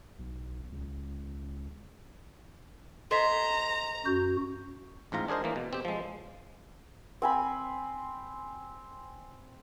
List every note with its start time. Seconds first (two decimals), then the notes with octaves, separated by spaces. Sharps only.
0.19 B1
0.72 C#2
3.11 A4 C5 D#5 A#5 B6
4.06 F#2 F#4 G6
5.12 A1 G#2 F4 A#5
5.28 D4 G#4 A#4 C5 D#5
5.44 E3 A#3
5.56 B2
5.73 C4 G4
5.85 F3 G#3
7.22 C4 G#5 B5